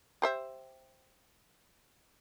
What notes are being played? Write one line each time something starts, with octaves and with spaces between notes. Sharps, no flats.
G4 C5 E5